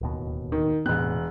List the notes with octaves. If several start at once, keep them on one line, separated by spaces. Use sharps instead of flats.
D1 D#2 B2
D#3
E1 A2 C3 B3 F#6